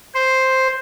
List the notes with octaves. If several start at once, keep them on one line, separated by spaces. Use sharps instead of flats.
C5